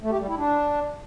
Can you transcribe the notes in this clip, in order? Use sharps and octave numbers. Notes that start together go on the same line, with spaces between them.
A3
G4
G3
E4
D4